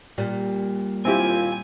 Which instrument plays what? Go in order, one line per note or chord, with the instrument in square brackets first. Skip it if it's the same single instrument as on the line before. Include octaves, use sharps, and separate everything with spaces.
[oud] A#2 G3
[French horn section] D#2 F4 [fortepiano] C4 E4 G4 [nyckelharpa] G#5